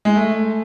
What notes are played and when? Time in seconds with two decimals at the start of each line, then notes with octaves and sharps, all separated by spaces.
0.05 G#3
0.16 A3